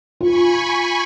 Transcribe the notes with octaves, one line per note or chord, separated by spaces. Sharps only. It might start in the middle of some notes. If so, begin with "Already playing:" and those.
F4 G#5 B5 C#6